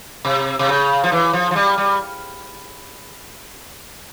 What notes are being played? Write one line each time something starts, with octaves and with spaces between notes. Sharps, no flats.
C3
C3
C#3
F3
E3
F3
F3
G3
G3